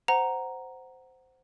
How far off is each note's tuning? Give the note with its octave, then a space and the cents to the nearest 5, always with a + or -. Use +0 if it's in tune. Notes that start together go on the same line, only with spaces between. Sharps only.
C5 -10 F#5 +5 A#5 +0